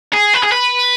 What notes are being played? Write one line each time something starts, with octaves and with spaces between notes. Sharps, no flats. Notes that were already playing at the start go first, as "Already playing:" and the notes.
G#4
B4
G#4
B4